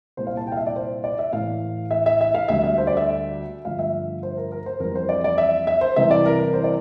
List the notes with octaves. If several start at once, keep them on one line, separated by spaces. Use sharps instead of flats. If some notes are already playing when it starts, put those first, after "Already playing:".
C2 A#2 G3 C5
F5
A5
G5
F5
E5
D5
C5
D5
E5
A2 E3 A3 F5
E5
E5
E5
F5
D2 D3 G3 E5
E5
C5
D5
E5
G2 D3 F3 A3 F5
E5
C5
A#4
A#4
C5
F2 E3 G3 A#4
C5
D5
D5
E5
E5
C5
C2 C3 E3 E5
D5
A#4
A#4
C5
D5